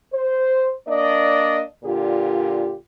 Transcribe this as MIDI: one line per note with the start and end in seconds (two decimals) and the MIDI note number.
0.13 0.73 72
0.88 1.63 58
0.88 1.63 62
0.88 1.63 74
0.88 1.63 75
1.83 2.74 46
1.83 2.74 50
1.83 2.74 65
1.83 2.74 67